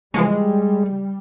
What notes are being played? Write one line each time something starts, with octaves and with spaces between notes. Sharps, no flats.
E3 F3 G3 G#3 C#4